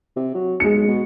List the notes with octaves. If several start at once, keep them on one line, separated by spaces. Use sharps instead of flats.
C3
F#3
B1 G#3 C#7
B2